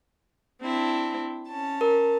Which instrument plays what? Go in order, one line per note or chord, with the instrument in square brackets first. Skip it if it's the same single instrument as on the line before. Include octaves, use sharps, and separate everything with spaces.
[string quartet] C4 D4 E4
C#4 A5
[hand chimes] A#4